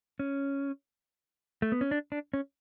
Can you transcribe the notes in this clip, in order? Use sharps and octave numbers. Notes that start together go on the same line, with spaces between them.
C#4
A3
B3
C#4
D4
D4
C#4